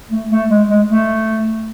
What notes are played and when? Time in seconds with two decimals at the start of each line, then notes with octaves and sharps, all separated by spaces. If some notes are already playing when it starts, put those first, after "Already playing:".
0.10 A3
0.30 A3
0.49 G#3
0.68 G#3
0.88 A3